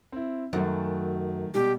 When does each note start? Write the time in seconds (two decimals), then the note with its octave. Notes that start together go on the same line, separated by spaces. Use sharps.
0.12 C4 E4
0.53 F#2 D#3 A3
1.54 B2 G3 G4